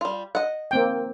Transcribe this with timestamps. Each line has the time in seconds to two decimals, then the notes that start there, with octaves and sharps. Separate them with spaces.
0.01 G3 F4
0.35 D#5 F#5
0.71 A#3 C4 G5